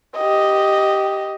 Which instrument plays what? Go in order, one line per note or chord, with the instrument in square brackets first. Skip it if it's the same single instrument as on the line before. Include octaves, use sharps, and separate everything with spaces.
[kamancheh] G4 D#5